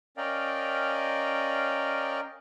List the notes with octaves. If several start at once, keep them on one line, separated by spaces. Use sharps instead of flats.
C#4 A#4 D5 D#5 F5 G5